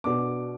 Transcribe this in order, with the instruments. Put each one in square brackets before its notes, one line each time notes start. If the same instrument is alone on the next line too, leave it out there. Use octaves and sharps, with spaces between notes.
[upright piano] B2 B3 D4 D6